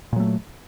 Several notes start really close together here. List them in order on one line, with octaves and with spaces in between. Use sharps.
A#2 F#3 A3